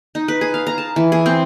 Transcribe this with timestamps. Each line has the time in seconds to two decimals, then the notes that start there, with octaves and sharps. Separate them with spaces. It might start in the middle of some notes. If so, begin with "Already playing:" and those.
0.15 D#4
0.28 B4
0.41 G#4
0.54 F5
0.67 A#5
0.78 A5
0.96 E3
1.12 G#4
1.26 C4